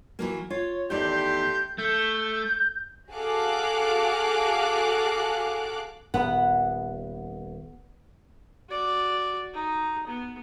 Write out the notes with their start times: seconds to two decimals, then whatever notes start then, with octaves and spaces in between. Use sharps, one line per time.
0.19 E3 F#3 A#3
0.50 F4 C#5
0.90 E2 D#3 A3 G4 D5 C6 G6
1.78 A3 G6
3.12 F#4 G#4 A4 F5 D6 F#6
6.14 D#1 B3 F#5
8.69 F#4 D5
9.53 D#4
10.07 B3